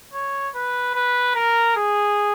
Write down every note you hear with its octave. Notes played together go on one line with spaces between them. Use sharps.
C#5
B4
B4
A#4
G#4